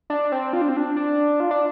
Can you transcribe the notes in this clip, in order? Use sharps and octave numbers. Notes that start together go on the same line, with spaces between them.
D4
C4
F4
D4
C4
D4
D4
F4
D4